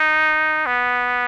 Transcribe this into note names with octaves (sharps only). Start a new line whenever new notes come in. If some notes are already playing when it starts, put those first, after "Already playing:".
Already playing: D#4
B3